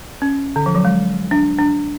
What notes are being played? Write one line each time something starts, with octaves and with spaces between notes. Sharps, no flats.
C#4
D3
F3
F#3
G#3
D4
D4